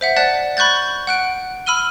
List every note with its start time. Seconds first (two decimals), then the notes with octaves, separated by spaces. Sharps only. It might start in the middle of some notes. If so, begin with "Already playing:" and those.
0.01 C5 E5 F#5
0.16 D5 F#5 A5 F#6
0.57 B5 C#6 F#6 G6 A6
1.07 F#5 F#6 D7
1.66 B5 E6 F6 D#7 G7